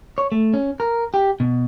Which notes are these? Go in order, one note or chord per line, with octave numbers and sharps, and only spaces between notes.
C#5
A3
C#4
A#4
G4
B2